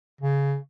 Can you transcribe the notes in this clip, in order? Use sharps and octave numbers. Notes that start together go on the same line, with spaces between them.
C#3